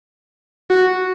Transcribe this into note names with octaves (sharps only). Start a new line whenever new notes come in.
F#4